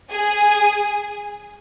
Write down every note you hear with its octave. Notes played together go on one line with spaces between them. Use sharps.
G#4 G#5